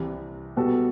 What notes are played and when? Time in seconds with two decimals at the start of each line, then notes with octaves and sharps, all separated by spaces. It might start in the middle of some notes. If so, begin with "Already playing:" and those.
Already playing: C2 C3 E3
0.56 B2 G3 B3 F#4 A4